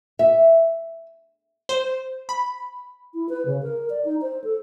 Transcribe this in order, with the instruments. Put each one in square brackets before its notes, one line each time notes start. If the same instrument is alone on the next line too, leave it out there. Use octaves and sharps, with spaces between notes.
[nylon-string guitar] E5
[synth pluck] C5
B5
[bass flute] E4
B4
C#3
A#4
D5
D#4
C5
A4